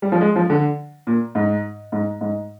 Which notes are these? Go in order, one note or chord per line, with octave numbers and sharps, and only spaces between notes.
G3
F3
G#3
F3
D3
A#2
G#2
G#2
G#2